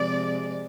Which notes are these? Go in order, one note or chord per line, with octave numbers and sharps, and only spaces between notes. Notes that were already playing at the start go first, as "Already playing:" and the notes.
Already playing: C3 F3 G#3 D5